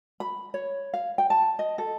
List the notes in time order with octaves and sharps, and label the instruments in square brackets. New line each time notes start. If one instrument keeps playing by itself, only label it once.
[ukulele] B5
C#5
F5
G5
A5
D#5
A4